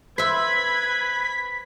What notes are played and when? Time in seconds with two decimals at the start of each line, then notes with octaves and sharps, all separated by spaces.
0.18 B4 C5 E5 B5 G#6 B6